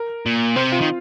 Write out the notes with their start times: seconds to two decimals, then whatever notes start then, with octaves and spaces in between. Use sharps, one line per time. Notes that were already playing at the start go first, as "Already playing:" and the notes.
Already playing: A#4
0.26 A#2
0.56 C3 C4 C5
0.72 F4 F5
0.81 D#3